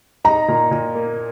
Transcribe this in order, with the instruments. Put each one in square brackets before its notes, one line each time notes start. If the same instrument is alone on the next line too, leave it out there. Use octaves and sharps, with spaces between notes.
[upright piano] D#4 [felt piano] A#5
[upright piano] A#2
A#2
A#3